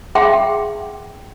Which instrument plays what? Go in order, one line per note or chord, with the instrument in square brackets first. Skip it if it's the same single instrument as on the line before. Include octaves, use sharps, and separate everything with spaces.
[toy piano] G#4 E5 F#5 G5 C6